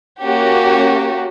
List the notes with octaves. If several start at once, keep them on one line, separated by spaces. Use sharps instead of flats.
A#3 C#4 F#4 G4